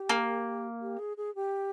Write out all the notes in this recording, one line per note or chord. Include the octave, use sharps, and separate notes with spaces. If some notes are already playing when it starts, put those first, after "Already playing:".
Already playing: G4
A#3
G4
G#4
G#4
G4